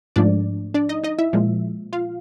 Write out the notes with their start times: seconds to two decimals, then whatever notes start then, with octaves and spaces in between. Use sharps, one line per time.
0.16 G#2 F3 A3 D4 D5
0.74 D4 D5
0.89 D#4 D#5
1.03 D#4 D#5
1.19 E4 E5
1.33 A#2 F3 G#3
1.93 F4 F5